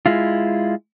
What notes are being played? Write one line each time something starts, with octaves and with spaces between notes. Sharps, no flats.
G#3 E4 F4